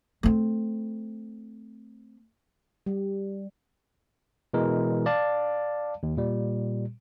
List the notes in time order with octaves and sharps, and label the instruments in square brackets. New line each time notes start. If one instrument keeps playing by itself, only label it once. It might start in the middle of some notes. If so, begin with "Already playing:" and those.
[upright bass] A3 C4
[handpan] G3
[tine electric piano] B2 E3 G#3 A#4
D5 F5 A5
D#2
A#2 G3